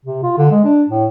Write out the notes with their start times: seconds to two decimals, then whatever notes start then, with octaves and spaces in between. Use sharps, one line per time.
0.06 C3
0.23 F4
0.38 D3
0.51 G#3
0.64 D4
0.89 A2